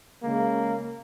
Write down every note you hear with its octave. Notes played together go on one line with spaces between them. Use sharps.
C#3 G#3 A#3